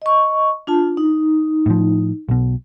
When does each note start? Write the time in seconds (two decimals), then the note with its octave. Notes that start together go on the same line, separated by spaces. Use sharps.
0.02 D#5 C#6
0.67 D4 F4 A5
0.97 D#4
1.66 A2 F3
2.29 B1 B2